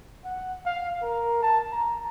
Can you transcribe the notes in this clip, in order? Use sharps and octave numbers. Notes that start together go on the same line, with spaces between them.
F#5
F5
A#4
A5
A#5